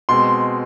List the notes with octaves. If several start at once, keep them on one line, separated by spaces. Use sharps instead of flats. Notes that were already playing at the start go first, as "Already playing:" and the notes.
B2 G#3 C4 C6